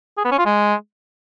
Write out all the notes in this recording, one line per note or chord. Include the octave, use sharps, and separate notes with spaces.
G#4
B3
C#4
F4
G#3